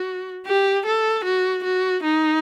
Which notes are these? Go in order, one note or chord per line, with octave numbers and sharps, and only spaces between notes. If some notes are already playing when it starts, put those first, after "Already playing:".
Already playing: F#4
G4
A4
F#4
F#4
D#4